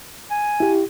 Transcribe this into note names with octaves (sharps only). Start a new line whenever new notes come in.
G#5
E4 G4